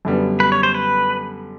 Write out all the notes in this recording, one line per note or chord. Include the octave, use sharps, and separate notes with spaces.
F#2 D3 G3 B3
B4
C#5
C5
B4